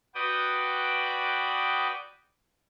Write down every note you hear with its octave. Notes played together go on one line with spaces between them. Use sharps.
F#4 B4 D5 G5 D#6